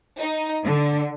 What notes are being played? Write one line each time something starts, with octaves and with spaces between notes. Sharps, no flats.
D#4
D3